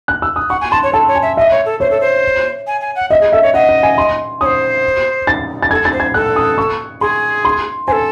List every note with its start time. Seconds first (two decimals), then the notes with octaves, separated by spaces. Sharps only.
0.08 F#6
0.22 E6
0.36 D#6
0.50 F#5 C#6
0.61 G#5
0.71 A5 C6
0.83 C#5
0.93 A4 A5
1.08 C#5
1.15 G#5
1.22 E5
1.37 D#5 E5
1.51 C#5
1.66 A4
1.80 C5 C#5
1.91 A4
2.01 C5
2.67 G#5
2.81 G#5
2.96 F#5
3.10 D#5 E5
3.21 G#4
3.32 A4 E5
3.43 C#5
3.54 D#5 F#5
3.68 F#5
3.83 G#5
3.98 C6
4.41 C#5 D#6
4.46 C5
5.27 A6
5.63 A6
5.71 A4 G#6
5.85 A6
5.92 C5
6.00 G#6
6.14 A4 F#6
6.36 D#6
6.58 C#6
7.01 G#4 C6
7.45 C6
7.87 A4 C5 G#5